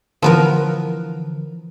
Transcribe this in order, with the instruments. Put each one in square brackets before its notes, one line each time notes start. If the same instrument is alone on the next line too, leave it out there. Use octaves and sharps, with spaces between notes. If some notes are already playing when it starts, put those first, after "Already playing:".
[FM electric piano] D3 E3 [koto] F3 B3 A#4